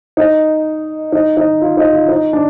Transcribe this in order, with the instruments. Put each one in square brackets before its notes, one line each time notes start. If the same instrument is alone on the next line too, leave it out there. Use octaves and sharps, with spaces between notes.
[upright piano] D#4
D#4
D#4
F4
D#4
F4
D#4
D4